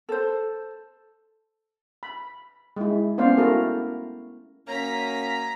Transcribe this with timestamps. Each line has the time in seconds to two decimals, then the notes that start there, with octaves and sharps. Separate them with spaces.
0.09 A4 C5
2.03 B5
2.76 G#3 E4
3.18 A3 B3 C#4 C5 D5 F5
3.37 E4 F#4 A4 A#4
4.68 F#2 A#3 C#4 A#5 B6